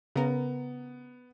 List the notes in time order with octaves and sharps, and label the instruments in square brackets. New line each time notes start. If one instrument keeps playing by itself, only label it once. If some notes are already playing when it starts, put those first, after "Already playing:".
[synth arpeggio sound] C#3 A#4 [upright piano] B3